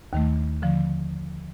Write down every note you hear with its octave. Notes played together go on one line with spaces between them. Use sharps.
D#2 D#3 A3
D3 F3